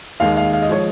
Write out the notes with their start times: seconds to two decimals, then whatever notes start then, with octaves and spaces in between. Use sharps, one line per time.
0.20 D#2 D#3 G#3 F5
0.37 F5
0.53 F5
0.62 D#5
0.69 F3 G#3 C#5